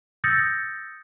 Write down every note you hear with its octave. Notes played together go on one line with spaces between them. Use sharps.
D#6 E6 G6 A6 A#6 C#7